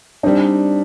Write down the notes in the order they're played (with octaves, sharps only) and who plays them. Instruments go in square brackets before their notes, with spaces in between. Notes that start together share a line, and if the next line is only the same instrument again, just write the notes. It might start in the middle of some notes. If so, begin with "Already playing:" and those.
[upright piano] G3 C4 D#4 [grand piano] D4